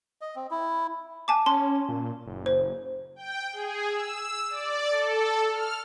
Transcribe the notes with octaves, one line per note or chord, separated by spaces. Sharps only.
D#5
C4
E4
G#5 A5 D6
C#4 A5 C6
A#2
F#1
C5
G5
G#4
E6
E6
D5
A4
F6